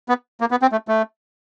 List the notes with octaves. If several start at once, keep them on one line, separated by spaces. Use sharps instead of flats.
B3
A#3
B3
C4
A3
A3